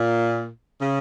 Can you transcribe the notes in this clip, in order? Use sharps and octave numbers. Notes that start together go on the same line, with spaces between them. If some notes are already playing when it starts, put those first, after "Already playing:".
Already playing: A#2
C#3